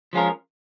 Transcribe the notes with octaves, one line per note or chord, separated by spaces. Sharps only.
F3 G#3 C#4 F4 A#4